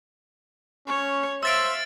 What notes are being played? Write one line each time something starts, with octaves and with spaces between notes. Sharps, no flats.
C#4 C#5
C5 E5 F5 E6 A6 D7